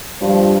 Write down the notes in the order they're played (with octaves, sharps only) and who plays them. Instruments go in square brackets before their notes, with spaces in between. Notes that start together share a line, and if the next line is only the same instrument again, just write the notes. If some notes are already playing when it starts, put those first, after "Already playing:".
[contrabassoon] G2 [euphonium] F3